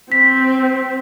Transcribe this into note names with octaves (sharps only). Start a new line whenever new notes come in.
C4 B6